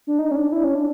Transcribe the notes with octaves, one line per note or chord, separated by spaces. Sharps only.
D4
D#4
C#4
D4
E4
C#4
D4